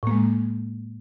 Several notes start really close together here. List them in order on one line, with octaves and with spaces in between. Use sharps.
A2 A#3 G#3